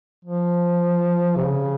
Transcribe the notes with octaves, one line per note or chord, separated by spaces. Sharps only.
F3
C3
C#3